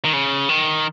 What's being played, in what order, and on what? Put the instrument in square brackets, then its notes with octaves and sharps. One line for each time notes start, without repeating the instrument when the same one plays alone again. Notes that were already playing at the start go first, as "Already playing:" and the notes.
[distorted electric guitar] D#3
C#3
D#3